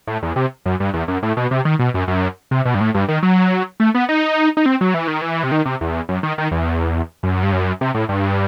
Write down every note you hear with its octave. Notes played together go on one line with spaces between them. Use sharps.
A2
E2
C3
F#2
G2
E2
F#2
A2
B2
C3
D#3
B2
F#2
F#2
C3
B2
G2
A2
G2
D#3
F#3
A3
B3
D#4
D#4
C4
F#3
E3
D#3
E3
C3
D#3
C3
E2
F#2
D#3
D#3
E2
F#2
G2
F#2
C3
A2
G2